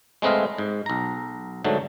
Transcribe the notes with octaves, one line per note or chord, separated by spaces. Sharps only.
G#3 A3 C4 B4 D#5 F5
G#2
B1 A#5
G#2 D3 F#3 A3